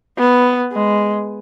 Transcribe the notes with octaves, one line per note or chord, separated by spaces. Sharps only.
B3
G#3